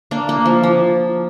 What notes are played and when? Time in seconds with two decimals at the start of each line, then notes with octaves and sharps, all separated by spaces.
0.11 A#3 D4
0.29 A#3
0.46 F3
0.63 F3